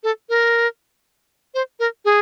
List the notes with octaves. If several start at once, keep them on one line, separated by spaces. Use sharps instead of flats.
A4
A#4
C5
A#4
G#4